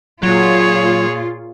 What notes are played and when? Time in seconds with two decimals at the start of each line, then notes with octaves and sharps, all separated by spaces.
0.23 A#2 F#3 F4 G#4 C#5